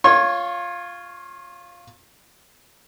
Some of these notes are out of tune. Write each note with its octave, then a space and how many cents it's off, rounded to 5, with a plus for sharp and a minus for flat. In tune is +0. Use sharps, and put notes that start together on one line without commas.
F4 +0 C#5 +0 C6 +40